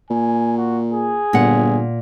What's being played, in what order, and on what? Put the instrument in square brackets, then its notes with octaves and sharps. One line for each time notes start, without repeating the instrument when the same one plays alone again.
[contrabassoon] A#2 [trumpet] G#5
[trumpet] F#4
G#4
[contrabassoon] G1 [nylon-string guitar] A#2 F#5